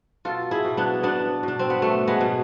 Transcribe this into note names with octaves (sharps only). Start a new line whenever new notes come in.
B2 F4 A4
E4 G#4
B2
B3 D4
B2 B3 D4
B2 D4
C4
B3
B2 A3
G#3 B3
B2